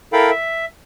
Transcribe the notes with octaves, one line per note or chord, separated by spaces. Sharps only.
E4 A4 A#4 F5 G5 B5
E5